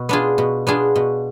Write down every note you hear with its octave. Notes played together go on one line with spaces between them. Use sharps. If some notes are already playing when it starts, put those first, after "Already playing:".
Already playing: B2
B3 D4 F4 G#4
B2
B3 D4 F4 G#4
B2